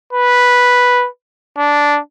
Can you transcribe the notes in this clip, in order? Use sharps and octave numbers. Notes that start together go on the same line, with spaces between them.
B4
D4